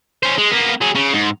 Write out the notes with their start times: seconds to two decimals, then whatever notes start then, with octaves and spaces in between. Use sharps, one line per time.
0.23 C#4 C5
0.38 G#3
0.51 A#3 B3
0.81 F#3 G#4
0.95 C#3
1.14 G#2